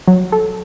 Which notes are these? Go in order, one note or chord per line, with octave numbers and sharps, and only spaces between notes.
F#3
A4